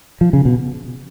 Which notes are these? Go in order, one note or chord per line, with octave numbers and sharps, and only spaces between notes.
F3
C#3
B2